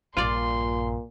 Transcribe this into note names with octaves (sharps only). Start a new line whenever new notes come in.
A#1 G2 A#2 F4 D5 C6